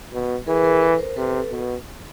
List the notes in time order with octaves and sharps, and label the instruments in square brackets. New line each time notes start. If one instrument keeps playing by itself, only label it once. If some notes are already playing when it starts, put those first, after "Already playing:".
[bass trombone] B2
[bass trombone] E3 [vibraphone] G#4 A#4
[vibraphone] B4
G#4 A#4
A4 B4
A#4 C5
[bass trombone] C3 [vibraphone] A4 B4
[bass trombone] B2